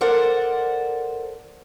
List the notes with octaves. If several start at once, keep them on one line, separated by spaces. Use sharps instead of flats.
A4 A#4 C5 D5 F#5